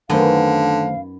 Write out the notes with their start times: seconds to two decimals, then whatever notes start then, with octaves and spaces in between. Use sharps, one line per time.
0.10 F#2 D3 D#3 A3 B3 D#4 C5 F5